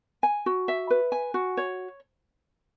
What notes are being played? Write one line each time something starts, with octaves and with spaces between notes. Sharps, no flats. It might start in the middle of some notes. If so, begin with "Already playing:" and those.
G#5
F#4
E5
B4
G#5
F#4
C#5